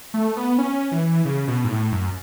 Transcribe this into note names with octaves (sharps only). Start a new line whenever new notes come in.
A3
B3
C#4
E3
C#3
B2
G#2
A2
F#2